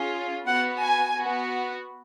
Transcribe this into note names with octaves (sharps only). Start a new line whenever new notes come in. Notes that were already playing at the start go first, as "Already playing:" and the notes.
Already playing: C#4 F4 G#4
B3 F#4 F#5
G#5
B3 F#4